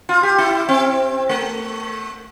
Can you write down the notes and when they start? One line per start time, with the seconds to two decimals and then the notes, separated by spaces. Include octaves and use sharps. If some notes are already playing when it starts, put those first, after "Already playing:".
0.09 F4
0.23 G4
0.38 E4
0.68 C4
1.29 A3